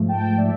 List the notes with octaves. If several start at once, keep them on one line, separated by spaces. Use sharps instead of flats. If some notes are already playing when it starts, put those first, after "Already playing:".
Already playing: G#2 F3 A3
G5 A5
D5 E5